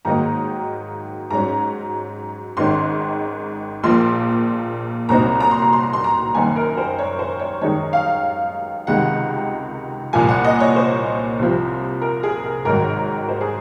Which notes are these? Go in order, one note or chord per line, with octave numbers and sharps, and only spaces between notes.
G#2 D#3 F#3 A#3 D#4 A#5
G#2 F#3 C#4 A#5
G#1 G#2 D#3 G#3 C#4 C6
A#1 A#2 F3 A#3 C6
C2 A#2 F#3 C4 D#4 A#5
A#5
C6
A#5
C6
A#5
C6
A#5
F#1 F#2 D#3 A#3 G#5
A#4
C5
C#5
C5
C#5
F#2 D#3 G#3 D#4 C#5
F5
C#2 C3 D#3 G#3 F#5
C2 A#2 F3 A#3 G#5
F#5
D#5
C#5
C5
C2 C3 F3 C4
A#4
G#4
A#4
G#1 G#2 D#3 F#3 A#4
C5
G#4